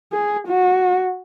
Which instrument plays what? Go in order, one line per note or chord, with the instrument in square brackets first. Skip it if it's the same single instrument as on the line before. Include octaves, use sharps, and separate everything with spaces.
[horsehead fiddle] G#4
F#4